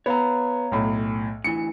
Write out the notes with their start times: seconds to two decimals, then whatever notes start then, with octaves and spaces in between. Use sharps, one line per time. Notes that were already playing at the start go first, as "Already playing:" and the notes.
0.06 B3 C#5 F5 A#5
0.72 B1 A2
1.44 D2 E3 C#7